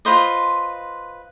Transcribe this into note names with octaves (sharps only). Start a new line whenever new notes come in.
F4 B4 C5 D#5